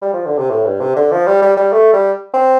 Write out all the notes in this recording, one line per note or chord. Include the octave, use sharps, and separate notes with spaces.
G3
F3
D3
C3
A2
G2
C3
D3
F3
G3
G3
G3
A3
G3
C4